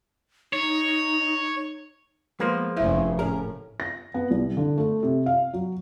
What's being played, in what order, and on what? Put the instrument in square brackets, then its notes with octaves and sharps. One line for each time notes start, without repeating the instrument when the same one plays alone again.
[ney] D#4 [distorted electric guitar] C#5
[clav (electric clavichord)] F3 A#3 [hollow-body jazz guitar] G#3 B3
[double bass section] F1 G2 C#3 [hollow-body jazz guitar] E4 [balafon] C5 E5
[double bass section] A2 [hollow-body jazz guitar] C#4 G#4 A#4
[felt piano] A#6
B3
C2
D3
A3
C3
F5
F#3